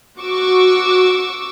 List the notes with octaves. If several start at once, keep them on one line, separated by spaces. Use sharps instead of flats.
F#4 C#6 D6 E6